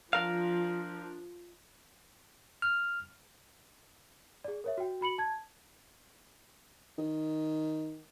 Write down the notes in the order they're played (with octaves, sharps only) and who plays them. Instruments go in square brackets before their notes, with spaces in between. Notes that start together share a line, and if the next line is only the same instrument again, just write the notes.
[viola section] F3 [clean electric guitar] D4 A#4 F5
[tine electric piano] F6
[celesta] G#4 D5
A#4 C#5 E5
F#4 G5
F#4 B5 C#7 F#7
A5 G#6
[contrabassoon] D#3